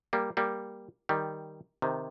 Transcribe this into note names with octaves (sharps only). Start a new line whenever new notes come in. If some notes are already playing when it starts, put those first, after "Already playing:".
G3 A#3
G3 A#3
D#3 G3
C3 D#3